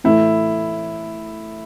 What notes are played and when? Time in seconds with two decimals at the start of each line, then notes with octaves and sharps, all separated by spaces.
0.04 A2 E3 A3 E4